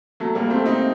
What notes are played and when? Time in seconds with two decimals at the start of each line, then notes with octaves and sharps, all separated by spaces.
0.20 F#3 A3
0.35 G3 A#3
0.50 A3 C4
0.66 C4 D#4